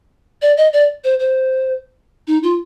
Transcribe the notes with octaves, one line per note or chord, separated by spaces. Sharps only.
D5
D#5
D5
C5
C5
D#4
F4